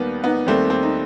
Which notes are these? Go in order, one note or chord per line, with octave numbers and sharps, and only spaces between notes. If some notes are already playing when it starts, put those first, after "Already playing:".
Already playing: D#2 D#3 G3 B3
B3 D#4
D#2 D#3 G3 A3 C4
A3 C4
D#4